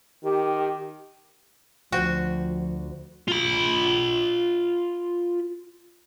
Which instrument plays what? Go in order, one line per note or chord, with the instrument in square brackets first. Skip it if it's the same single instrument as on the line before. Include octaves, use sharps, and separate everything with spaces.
[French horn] D#3 [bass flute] G4
[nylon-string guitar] D2 C5 G5 [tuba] F3 [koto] F#4
[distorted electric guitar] F4 B5